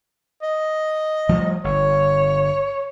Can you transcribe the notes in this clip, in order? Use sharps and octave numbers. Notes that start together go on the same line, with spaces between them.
D#5
F3 G3 A3
G1 C#5